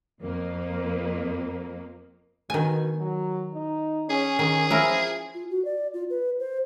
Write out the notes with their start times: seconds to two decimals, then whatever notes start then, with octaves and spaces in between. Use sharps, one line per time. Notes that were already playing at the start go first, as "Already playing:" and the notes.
0.22 F2 A#3
2.50 B2 D#3 G#5
2.99 F#3
3.54 D#4
4.10 C#4 G#4
4.39 D#3 G#4
4.70 F3 C#4 E4 A#4
5.34 F4
5.50 F#4
5.65 D5
5.94 F4
6.10 B4
6.40 C5